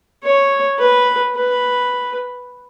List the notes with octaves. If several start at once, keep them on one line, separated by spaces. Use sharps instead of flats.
C#5
B4
B4